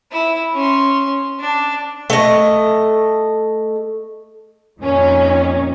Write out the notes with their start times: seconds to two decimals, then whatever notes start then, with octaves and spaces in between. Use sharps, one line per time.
0.12 E4
0.53 C#4 C6
1.40 D4
2.10 A3 D#5
4.79 F2 A#2 D#3 C#4